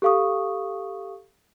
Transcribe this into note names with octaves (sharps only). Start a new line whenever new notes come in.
G4 A4 F5 C#6 D#6